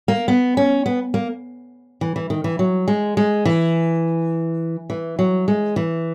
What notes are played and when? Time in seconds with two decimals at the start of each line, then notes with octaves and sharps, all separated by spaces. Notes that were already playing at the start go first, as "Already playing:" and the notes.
0.08 A#3
0.28 B3
0.57 C#4
0.86 B3
1.14 A#3
2.01 E3
2.16 E3
2.30 D#3
2.44 E3
2.59 F#3
2.88 G#3
3.17 G#3
3.45 E3
4.90 E3
5.19 F#3
5.48 G#3
5.76 E3